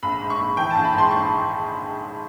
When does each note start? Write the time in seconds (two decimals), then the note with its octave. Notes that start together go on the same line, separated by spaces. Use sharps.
0.03 A#1 B5
0.21 G#2
0.30 C#6
0.39 A#1
0.57 E3 G5
0.70 A5
0.75 A#1
0.84 B5
0.94 G#2 C6
1.11 A#1 C#6